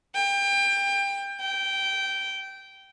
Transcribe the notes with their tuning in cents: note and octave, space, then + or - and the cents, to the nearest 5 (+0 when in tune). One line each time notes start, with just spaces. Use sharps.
G5 +25
G5 -15